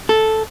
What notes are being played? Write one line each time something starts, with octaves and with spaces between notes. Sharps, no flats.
A4